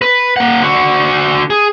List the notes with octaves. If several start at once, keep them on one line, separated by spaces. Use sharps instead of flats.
B4
A#3 F#5
D3 F#4
G#4